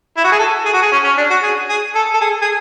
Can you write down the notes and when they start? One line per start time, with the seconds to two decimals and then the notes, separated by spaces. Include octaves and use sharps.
0.17 E4
0.24 F#4
0.32 G#4
0.39 A4
0.65 G#4
0.73 F#4
0.82 G#4
0.92 C#4
1.04 C#4
1.18 D4
1.30 F#4
1.43 G#4
1.69 G#4
1.95 A4
2.13 A4
2.21 G#4
2.42 G#4